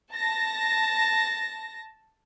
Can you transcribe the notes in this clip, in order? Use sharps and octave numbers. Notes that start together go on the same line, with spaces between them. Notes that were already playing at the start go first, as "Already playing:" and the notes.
A5 A#6